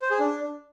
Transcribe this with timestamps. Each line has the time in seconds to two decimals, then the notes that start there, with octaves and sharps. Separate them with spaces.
0.02 C5
0.11 G#4
0.20 D4